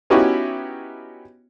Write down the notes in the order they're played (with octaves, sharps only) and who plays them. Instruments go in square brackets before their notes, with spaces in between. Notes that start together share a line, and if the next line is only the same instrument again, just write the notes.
[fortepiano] B3 C#4 D#4 E4 F#4 G4